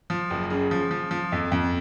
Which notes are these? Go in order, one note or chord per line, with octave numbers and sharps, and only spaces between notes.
F3
F#1
C#3
F3
F3
F3
F2
F2